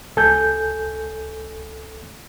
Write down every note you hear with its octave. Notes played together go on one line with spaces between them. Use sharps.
C#2 A4 G#5 G6